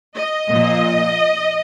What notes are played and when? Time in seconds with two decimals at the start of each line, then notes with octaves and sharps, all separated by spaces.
0.15 D#5
0.49 A#2 F3